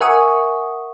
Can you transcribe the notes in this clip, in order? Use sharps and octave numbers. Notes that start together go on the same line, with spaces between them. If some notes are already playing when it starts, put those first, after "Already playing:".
A#4 E5 F#5 G#5 C#6 D#6